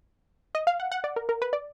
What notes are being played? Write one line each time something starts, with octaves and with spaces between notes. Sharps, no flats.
D#5
F5
F#5
F#5
D5
A#4
A#4
B4
D5